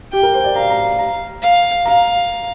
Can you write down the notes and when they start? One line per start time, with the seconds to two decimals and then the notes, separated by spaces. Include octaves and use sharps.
0.13 G4 G5
0.23 A#4
0.34 C5
0.44 D5
0.55 F5 A#5
0.70 A#5
0.99 A#5
1.42 F5
1.85 F5 A#5